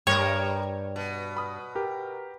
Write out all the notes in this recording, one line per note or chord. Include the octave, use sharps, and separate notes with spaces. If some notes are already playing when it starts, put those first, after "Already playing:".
G2 G3 A#4 C#5 G5
B2
B5 D#6 F6
G4 A#4